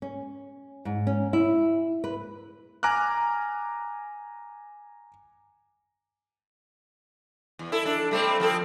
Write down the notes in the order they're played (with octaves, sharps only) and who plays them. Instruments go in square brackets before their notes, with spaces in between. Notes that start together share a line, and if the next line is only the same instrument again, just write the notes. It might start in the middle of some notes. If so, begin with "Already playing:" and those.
[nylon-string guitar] C#4
G#2
C#4
E4
B4
[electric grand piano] G#5 A#5 D6 F6 F#6
[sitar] E2
E4 A4
D4 A4
G3 A3 C4
F3 C4 A4